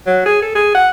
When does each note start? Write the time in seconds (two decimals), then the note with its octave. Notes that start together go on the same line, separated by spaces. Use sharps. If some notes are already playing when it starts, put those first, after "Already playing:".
0.07 F#3
0.26 G#4
0.42 A4
0.55 G#4
0.75 F#5